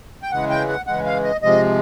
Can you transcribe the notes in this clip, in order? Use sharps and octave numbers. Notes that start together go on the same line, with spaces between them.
G5
C#3 E3 G#3 F#5
G5
F#5
C#3 E3 G#3 F#5
F5
D#5
C3 F3 G#3 D#5